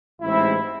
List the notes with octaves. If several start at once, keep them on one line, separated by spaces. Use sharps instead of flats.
A1 G#2 G#3 C4 E4